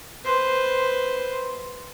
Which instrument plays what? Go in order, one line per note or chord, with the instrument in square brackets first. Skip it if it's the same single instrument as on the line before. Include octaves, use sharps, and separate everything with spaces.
[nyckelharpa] B4 C5